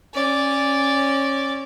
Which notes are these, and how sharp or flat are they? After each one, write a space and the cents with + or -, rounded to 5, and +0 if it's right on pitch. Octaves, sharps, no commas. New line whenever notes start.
C#4 -20 D5 -10